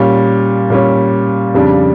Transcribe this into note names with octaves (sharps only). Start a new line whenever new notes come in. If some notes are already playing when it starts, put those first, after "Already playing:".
Already playing: A#2 G3 C#4
A#2 G3 C#4
F2 C#3 G3 D4